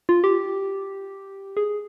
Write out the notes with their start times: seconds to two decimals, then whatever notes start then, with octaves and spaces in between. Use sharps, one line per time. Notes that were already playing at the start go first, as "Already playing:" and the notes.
0.09 F4
0.24 G4
1.57 G#4